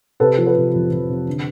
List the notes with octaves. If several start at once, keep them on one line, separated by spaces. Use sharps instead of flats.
C3 A4 B4
F3
A4 B4
C3
F2
F2
C3
D3